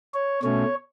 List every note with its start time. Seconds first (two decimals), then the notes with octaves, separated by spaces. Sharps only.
0.14 C#5
0.43 B2 A3 C#4 C#5